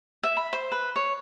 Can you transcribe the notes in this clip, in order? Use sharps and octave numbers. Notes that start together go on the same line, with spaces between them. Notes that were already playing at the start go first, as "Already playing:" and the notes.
E5
B5
C5
B4
C#5